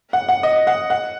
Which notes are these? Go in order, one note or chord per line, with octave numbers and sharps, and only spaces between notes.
F#5
F#5
D#5
F#5
F#5